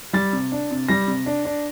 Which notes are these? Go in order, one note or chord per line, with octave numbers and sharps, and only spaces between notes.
G3 A6
C3
D4
C3
G3 A#6
C3
D4
D4